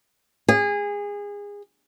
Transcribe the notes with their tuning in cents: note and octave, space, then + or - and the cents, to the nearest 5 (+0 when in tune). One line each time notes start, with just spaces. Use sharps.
G#4 -25